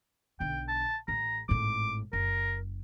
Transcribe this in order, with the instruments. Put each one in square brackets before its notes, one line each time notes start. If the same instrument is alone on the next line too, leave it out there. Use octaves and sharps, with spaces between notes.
[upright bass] B1 D3 [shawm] G5
[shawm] A5
[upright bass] A1 [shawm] A#5
[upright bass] G#1 A2 [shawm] D6
[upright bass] F#1 [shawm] A#4